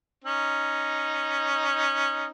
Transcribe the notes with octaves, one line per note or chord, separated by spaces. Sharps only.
C#4 D#4